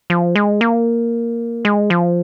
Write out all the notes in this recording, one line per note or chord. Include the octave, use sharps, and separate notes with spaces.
F3
G#3
A#3
G#3
F3